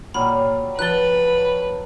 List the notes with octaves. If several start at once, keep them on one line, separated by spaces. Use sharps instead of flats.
A#2 F#3 G3 B5 F6
F3 B4 A5 F#6 A6 G7